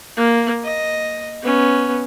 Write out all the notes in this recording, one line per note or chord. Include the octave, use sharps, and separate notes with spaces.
A#3
D#5
B3 C#4